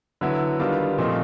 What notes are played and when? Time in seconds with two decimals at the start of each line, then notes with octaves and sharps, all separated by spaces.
0.21 D3 F#3 B3 E4
0.59 D#3 G3 B3 D4 F4
0.98 A#2 F3 A3 C4 D#4